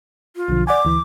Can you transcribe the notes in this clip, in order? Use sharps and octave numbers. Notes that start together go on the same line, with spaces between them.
F4
B1 D3 F3
D5 F#5 G#5 D6
D2 E3